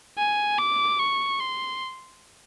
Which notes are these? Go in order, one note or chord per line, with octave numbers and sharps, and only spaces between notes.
G#5
D6
C#6
C6